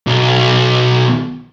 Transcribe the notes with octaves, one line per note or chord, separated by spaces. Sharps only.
B1